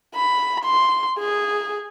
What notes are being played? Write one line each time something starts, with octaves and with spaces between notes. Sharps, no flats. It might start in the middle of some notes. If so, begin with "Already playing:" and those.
B5
C6
G#4